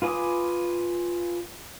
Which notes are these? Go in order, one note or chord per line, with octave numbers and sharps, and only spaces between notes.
F4 B4 G#5 D6 D#6